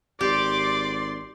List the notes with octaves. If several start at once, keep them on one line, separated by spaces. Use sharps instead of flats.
G#1 G4 D5 C6 D6